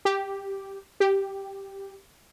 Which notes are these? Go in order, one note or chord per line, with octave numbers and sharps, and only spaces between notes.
G4
G4